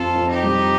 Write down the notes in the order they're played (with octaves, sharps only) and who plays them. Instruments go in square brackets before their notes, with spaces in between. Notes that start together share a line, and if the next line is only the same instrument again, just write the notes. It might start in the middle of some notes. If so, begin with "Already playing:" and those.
Already playing: [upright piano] F2 [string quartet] F4 A4
[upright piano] F2
[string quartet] D#4 G4
[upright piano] G3